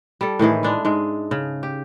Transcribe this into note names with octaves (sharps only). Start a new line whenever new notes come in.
G3 A4
A2 D#3 E3 G#4
G#3 D4 E4
G#2 G#3
C#3
G4